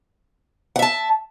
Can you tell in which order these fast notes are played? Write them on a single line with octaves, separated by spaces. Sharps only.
F#5 E5 A5